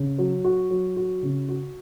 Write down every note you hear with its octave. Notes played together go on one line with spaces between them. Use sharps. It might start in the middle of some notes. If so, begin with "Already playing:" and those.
Already playing: C#3
F#3
F#4
F#3
F#4
C#3
F#4